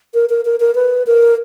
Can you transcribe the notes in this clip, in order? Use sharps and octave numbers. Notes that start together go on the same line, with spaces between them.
A#4
A#4
A#4
A#4
B4
A#4